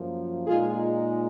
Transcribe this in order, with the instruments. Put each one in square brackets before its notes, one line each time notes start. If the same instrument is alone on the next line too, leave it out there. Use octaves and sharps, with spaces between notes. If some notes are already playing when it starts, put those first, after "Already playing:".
Already playing: [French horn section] F#2 F3 A#3
A#2 G#3 D#4 F4 G#4